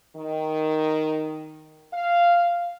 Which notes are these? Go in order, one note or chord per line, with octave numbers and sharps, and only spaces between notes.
D#3
F5